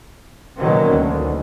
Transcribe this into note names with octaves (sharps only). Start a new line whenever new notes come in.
B2 D3 D#3 F#3 A#3 C#4
D2